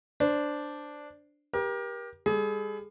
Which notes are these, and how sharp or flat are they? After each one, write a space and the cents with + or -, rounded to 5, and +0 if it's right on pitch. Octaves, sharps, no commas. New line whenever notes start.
D4 +0 C5 -5
G4 +15 A#4 +35
G3 +45 G#4 +40